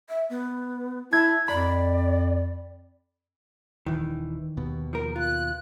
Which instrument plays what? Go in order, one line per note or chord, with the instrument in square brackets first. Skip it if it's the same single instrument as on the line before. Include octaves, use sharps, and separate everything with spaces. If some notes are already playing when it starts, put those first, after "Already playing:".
[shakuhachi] E5
B3
[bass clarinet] E4 [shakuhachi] A5 [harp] G#6
[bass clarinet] F2 [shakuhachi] D5 [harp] B5
[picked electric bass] D#1 E3 [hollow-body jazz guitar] D#3
[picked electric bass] D#2 B2
[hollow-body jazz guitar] F3 A#4
[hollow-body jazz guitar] F4 [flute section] F#6